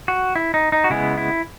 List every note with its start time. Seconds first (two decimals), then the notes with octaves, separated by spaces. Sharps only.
0.08 F#4
0.36 E4
0.54 D#4
0.72 D#4
0.84 F#4
0.90 C#3 G#3 B3 E4
1.18 E4